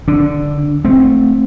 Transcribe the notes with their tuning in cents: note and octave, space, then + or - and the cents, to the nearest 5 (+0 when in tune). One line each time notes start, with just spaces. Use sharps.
D3 +0 D4 +0
A3 +0 C4 +0